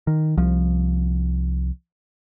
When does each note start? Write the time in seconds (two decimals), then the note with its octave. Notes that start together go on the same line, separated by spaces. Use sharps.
0.07 D#3
0.38 C2 F3